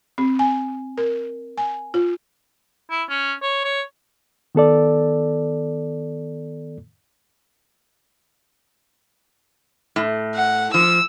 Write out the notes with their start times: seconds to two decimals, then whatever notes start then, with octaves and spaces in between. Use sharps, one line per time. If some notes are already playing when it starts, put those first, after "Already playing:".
0.18 C4
0.39 G#5
0.98 A#4
1.58 G#5
1.94 F4
2.91 E4
3.10 C#4
3.42 C#5
3.65 C#5
4.55 D#3 B3 A4 D5
9.96 A2
10.35 F#5
10.74 F3 E6